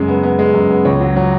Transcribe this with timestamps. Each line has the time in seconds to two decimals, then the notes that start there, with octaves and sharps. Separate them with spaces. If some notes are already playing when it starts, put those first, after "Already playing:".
Already playing: F#2 C#3 G#3
0.08 B3
0.23 B3
0.39 G#3
0.54 F#2
0.70 B3
0.85 C#2 C#5
1.00 F#3
1.16 F#3